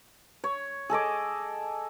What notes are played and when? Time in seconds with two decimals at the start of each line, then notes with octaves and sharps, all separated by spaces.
0.44 C#5
0.90 G#4 A4 D#5 D6